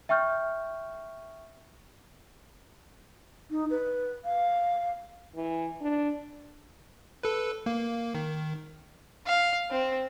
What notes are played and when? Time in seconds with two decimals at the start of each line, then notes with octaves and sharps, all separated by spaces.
0.09 E5 G5 C#6 F6 G6
3.51 D#4
3.70 B4
4.25 F5
5.36 E3
5.81 D4
7.23 A4 B4
7.66 A#3
8.15 D#3
9.27 F5
9.71 C4